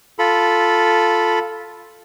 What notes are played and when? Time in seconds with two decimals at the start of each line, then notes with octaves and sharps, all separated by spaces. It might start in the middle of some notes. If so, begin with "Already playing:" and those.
0.19 F4 A4 B5